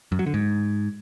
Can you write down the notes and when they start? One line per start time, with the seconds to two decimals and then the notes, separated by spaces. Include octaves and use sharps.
0.12 F#2
0.19 F#3
0.26 D3
0.34 G#2